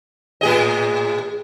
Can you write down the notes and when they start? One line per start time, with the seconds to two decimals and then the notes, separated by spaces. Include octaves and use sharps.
0.41 A2 G#4 D#5